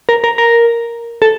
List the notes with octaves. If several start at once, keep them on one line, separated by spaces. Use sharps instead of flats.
A#4
A#4
A#4
A4